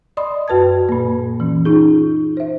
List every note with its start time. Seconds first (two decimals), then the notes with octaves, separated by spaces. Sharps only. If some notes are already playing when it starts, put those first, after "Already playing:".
0.17 D5 D#5 B5 C6 D#6
0.48 F#2 F#4 B4 A5 G#6
0.89 A#2 A#3
1.40 E3 C#4
1.65 C#4 D#4 F4 G#4
2.37 C5 E5